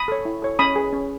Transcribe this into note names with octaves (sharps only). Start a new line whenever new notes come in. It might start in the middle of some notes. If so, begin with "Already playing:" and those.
Already playing: B5 D#6
A4 C#5
E4
A4 C#5
C#4 B5 D#6
G#4 B4
C#4